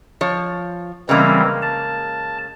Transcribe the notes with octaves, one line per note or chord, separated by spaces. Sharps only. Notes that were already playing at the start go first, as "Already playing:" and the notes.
F3 C#5
C#3 E3 G3 G#3 A#3 C4
A5